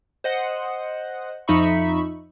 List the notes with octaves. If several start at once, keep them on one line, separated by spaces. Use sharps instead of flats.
C5 D#5 F#5
F2 F3 D#4 E5 B5 C#6